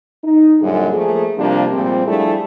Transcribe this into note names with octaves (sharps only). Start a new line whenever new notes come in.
D#4
F#2 A#2 D3 G3 G#3
F3 A3 A#3 G#4
C3 F3 G3 A#3 D4 G4
A#2 F3 G3 G#3 C4
F3 G3 A3 D4 E4 G#4